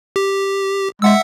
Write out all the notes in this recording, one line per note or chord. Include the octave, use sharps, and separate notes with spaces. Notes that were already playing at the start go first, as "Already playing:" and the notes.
G4
G#3 E5 F#5 E6